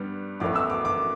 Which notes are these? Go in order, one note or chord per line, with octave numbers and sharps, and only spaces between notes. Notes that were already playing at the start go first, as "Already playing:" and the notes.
Already playing: G2 G3 B3
A1 A2 E3 B3 D6
E6
D6
D6